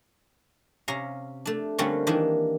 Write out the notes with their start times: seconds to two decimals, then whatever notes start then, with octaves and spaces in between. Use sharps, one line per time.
0.88 C3 C#4 F5 A#5
1.45 A3 D4
1.78 D3 G3 A3 A#3 C4 C#4
2.07 D#3 E3 A#3 D4